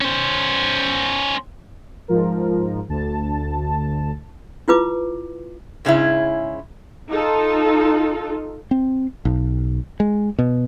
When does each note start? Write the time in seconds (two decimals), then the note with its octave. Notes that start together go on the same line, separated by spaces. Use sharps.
0.01 C#4 C5
2.08 G#2 F3 A#4
2.89 D2 A5
4.68 E4 F4 B4 D6
5.85 G#2 C#3 C#4 E4
7.11 D#4 F4 A4
8.71 C4
9.25 B1
10.00 G#3
10.39 B2